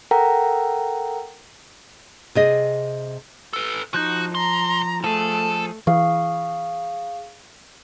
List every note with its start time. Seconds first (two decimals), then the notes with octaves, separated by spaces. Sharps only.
0.11 A4 A#4 F#5 G5 A#5
2.35 C3 G#4 D#5
3.53 A4 B4
3.94 F3 D#4 F#4 G6
4.35 B1 A#5 C6
5.04 F3 A3 G#4 A4 A5
5.87 E3 G#4 F5 C#6